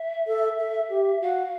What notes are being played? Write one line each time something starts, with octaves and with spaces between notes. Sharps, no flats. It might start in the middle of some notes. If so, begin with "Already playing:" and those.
Already playing: E5
A4
A4
G4
F#4 F5